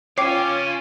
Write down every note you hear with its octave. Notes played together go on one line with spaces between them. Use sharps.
C#4 F4 C#5 F5 G5 G#5 D6 C7